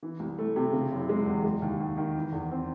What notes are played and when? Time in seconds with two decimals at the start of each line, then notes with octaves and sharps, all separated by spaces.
0.03 E3
0.20 C2
0.39 A3
0.56 C3
0.73 C#3
0.92 F#1
1.09 G#3
1.26 E2
1.44 G#3
1.62 D#2
1.80 D#2
1.97 D#3
2.15 E3
2.32 E2
2.51 C4